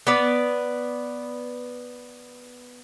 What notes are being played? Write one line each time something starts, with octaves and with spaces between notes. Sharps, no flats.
B3 B4 D5